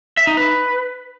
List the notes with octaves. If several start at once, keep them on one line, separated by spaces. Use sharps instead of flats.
E5
D#4
B4